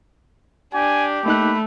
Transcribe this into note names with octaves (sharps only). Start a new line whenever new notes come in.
D4 G4 G#5
A3 A#3 D#4 B5 F#6